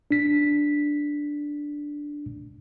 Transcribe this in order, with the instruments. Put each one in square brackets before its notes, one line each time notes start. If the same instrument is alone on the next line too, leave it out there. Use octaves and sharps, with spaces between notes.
[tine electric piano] D4 B6